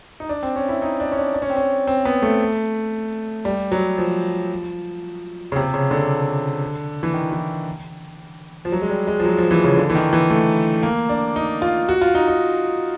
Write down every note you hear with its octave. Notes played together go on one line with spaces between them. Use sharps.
D#4
D4
C4
C#4
E4
D#4
D4
C#4
D4
D4
C#4
C4
C#4
C4
B3
A3
G3
F#3
F3
C#3
C3
C#3
D3
E3
D#3
E3
F3
F#3
G#3
G3
G#3
F3
F#3
F3
E3
C#3
D3
E3
D#3
E3
A3
A#3
D4
D#4
F4
F#4
F4
D#4
D#4